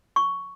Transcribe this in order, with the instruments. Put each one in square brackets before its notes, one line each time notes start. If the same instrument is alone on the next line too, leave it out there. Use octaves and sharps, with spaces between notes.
[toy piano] C#6